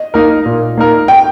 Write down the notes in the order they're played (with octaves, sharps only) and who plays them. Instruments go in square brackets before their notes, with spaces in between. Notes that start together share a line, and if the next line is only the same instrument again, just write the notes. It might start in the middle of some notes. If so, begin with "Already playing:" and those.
Already playing: [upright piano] D#5
[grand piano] A#3 D#4 A#4
A#2
A#3 D#4 A#4
[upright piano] G5